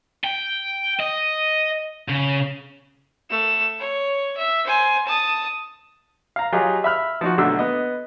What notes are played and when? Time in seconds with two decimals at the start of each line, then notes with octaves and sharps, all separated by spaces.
0.24 G5
1.00 D#5
2.09 C#3
3.30 A3 E7
3.79 C#5
4.38 E5
4.67 C5 G#5
5.07 A5 D#6
6.36 F5 A#5
6.52 F#3 F4 G4 G#4 D#5
6.84 E5 B5 F6
7.21 F3 D#4 F#4
7.38 B1 D3 A3 E6
7.59 B3 D#5